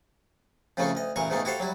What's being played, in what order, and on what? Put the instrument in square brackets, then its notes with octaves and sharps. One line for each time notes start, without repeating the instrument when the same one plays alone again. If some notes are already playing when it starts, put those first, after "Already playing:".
[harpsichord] F2 A2 C#3 F3 A3 A#3
D2 D#5
A1 A#2 E3 A#4 C#6
D2 G#2 B2 D#3 A3 A#3
E4 F#4 G4 A4 C5 F5
F#3 G3 E4